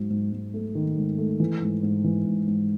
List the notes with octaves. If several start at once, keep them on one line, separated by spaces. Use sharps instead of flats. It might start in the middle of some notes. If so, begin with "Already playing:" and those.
Already playing: G#2 F#3
G#2
G#2
A3
D#3
G#2
A3
E3
G#2
G#2
E3
G#2
G#2